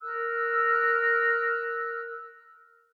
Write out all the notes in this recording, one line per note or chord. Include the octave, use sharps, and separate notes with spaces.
A#4 E6 F#6